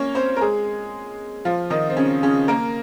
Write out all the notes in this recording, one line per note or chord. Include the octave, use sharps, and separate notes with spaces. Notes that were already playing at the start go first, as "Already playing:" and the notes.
Already playing: A#3 C#4 C#5
C4 C5
A#4
G#3 G#4
F3 F4
D#3 D#4
C4
C#3 C#4
C#3 C#4
A#3 A#4